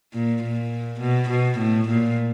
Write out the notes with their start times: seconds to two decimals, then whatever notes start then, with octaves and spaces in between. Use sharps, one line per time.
0.13 A#2
0.42 A#2
1.00 B2
1.29 B2
1.58 A2
1.88 A#2